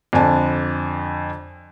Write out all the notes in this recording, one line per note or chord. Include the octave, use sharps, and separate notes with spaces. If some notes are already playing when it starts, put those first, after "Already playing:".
F2 D3 D4 G#5 A5